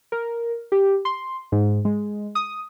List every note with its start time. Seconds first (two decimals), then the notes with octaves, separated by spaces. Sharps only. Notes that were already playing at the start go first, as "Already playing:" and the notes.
0.12 A#4
0.72 G4
1.05 C6
1.52 G#2
1.85 G#3
2.35 D#6